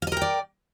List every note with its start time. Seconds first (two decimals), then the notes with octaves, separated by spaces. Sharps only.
0.02 F5
0.07 D#5
0.12 A#4
0.17 G5
0.22 D5